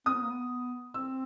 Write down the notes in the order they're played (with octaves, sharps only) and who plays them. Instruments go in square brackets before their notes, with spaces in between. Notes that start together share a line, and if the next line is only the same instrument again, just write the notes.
[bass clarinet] C4 [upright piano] D#6
[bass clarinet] B3
A#3
B3
[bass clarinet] C4 [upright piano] E6